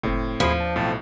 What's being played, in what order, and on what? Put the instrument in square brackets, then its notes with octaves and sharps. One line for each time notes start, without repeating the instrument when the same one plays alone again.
[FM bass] F#1 [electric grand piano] A2 C4
[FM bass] D#2 [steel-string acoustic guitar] F3 [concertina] E4 G#4 C5
[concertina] D4 [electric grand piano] A5
[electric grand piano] B1 A2 [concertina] C4 A5